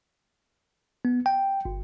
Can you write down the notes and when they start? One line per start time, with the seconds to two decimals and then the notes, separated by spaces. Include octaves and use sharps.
1.05 B3
1.26 G5
1.65 G1